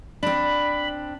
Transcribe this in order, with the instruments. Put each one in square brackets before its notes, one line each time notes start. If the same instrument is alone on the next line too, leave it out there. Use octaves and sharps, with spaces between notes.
[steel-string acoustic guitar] C4 D4 [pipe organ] B5